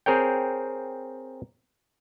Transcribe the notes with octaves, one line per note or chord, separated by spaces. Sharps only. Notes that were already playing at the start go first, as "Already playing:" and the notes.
C4 G#4 A#4 C#5 G5